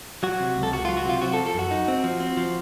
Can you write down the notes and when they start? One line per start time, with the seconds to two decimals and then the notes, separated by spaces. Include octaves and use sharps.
0.23 F#3 F#4
0.40 C3
0.56 C#2
0.63 A4
0.72 C#2 F#4
0.85 F#3 F4
0.97 F#4
1.06 C3 F4
1.22 C4 F#4
1.34 A4
1.39 F3
1.46 A4
1.54 F#2 F#4
1.71 D#4
1.88 C4
2.04 F3
2.20 C4
2.37 F3